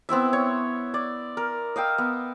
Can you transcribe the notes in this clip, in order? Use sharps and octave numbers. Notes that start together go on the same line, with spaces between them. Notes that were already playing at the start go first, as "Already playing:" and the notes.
B3 C4 E4 E5
C#5
D5
A#4
D#5 F5 G5 E6
B3